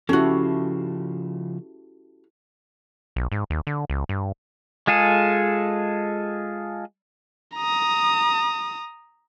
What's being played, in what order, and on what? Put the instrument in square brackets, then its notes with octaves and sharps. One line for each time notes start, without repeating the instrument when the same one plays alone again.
[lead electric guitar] C#3 F3 [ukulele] C#4 F#4 [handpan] E4 G4 A4
[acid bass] B1
G#2
D#2
D3
C#2
G2
[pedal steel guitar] G#3 F4 G#4 A4
[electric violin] A#5 D#6